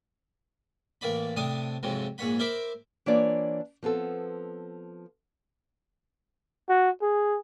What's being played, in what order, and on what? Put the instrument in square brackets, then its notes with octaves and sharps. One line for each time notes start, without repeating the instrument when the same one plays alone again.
[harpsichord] A1 A#3 D5 B5
A2 C3 D4 D#6
F2 G#2 C3 F#3
A#1 G#2 C#5 F#5 B5
A#4 C5 E5 B5 D6
[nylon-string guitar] E3 A#3 D4 F4 C#5 D5
F3 B3 C4 A4
[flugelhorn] F#4
G#4